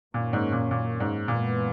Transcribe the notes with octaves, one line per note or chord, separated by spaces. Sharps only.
F#2 A#2 D#3 A#3 C#4
G#2
A#2
A#2
G#2
F#2 A#2 E3 G#3 B3